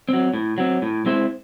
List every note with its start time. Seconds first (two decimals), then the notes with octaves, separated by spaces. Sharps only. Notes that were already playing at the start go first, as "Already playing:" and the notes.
0.09 F#3 C4
0.34 A2
0.58 F#3 C4
0.82 A2
1.06 G#3 C4 E4 C5